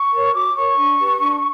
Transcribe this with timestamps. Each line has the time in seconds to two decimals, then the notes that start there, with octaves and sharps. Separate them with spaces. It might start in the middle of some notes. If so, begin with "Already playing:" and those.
Already playing: C#6
0.12 A#4 C#5
0.34 F#4 D6
0.55 A#4 C#5 C#6
0.77 D4
0.98 G4 B4
1.20 D4